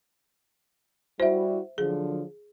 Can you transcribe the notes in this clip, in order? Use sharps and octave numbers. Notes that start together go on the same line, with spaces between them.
G3 E4 F#4 C5 E5
D3 F3 F#3 G#4